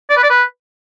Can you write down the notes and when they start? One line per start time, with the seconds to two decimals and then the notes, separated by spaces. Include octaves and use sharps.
0.10 D5
0.16 B4
0.23 D5
0.30 B4